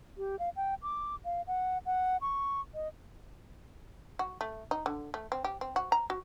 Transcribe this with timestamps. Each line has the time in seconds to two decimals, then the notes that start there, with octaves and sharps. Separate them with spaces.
0.18 G4
0.39 F5
0.56 G5
0.82 D6
1.25 F5
1.47 F#5
1.86 F#5
2.21 C#6
2.74 D#5
4.19 F#4
4.41 A3
4.71 D#4
4.86 D3
5.14 A3
5.32 C4
5.44 G4
5.61 C4
5.76 F#4
5.92 A#5
6.10 F#4